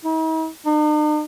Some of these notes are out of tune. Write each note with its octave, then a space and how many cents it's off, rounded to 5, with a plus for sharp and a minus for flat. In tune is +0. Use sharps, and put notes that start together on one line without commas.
D#4 +45
D#4 -45